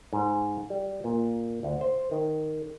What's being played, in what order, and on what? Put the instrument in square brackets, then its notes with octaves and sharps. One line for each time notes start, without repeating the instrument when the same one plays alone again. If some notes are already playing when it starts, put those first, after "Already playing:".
[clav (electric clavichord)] G#2
G3
A#2
D2
C5
D#3